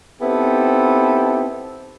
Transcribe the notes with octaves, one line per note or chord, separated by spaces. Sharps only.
B3 C4 D#4 E4 G4 A4